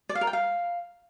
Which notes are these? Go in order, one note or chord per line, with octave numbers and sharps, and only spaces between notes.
D5
F5
A#4
G5
F5